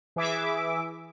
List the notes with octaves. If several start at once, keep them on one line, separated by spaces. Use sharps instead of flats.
E3 G#4 E5 D6